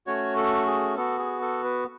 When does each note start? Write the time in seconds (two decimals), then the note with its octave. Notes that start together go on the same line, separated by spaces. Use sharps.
0.07 A3 C#4 F#4 C#5
0.37 A4
0.67 G#4
0.96 B3 F#4 A4
1.19 G#4
1.41 A4
1.64 B4